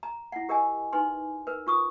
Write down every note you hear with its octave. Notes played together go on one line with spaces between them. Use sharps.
A#5
E4 F#5
G4 A#4 D5 D#5 G#5
D#4 B4 G#5 C6
A#4 B4
F4 C#6 D#6